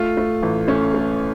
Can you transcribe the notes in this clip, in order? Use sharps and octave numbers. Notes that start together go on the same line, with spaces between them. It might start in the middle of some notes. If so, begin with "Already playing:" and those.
Already playing: A3 F4
A3
A1
A3 C#4
A3